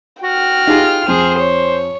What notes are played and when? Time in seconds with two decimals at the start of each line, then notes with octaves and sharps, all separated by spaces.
0.23 F#4 G5 F6
0.67 D#4 F4 G4 G#4
1.08 F2 G#4 C5
1.38 C#5